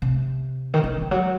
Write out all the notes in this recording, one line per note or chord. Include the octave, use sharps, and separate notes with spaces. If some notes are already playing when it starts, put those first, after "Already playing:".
C3
D#3
E3
E3
F#3